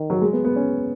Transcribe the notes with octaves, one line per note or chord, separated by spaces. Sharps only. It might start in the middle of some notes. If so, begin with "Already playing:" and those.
Already playing: D#3
F#3
G#3
B3
B3
C#4